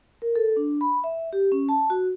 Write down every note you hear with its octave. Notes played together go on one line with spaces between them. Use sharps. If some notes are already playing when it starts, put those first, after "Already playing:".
A#4
A4
D4
B5
E5
G4
C#4
A5
F#4